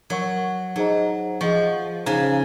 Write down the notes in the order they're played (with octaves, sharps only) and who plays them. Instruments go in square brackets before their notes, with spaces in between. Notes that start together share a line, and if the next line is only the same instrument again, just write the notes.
[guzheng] F#3 [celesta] A#4 C#5 F#5 C#6
[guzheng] F#3 [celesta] D#4 G#4 C5 D#5 A#5
[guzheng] F3 [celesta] G#4 D#5 F#5 C#6
[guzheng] C#3 [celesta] D#4 G#4 C5 F5 A#5